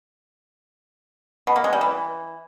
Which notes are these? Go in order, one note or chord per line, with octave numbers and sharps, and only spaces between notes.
B2
A#3
G#3
G3
E3